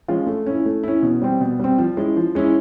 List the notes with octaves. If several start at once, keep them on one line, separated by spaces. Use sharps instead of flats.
F3 G#3 C#4 F4
A3
C#4 E4
A3
C#4 E4
B2
G3 C4
B2
G3 C4
F3
G#3 C#4 E4
F3
G#3 C#4 E4